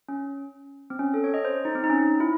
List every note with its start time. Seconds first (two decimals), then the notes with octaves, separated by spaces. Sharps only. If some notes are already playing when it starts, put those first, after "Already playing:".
0.08 C#4
0.90 C4
0.99 C#4
1.14 A4
1.24 C#5
1.34 D#5
1.45 C5
1.65 D#4
1.75 C4
1.84 D#4
1.90 C#4
2.20 E4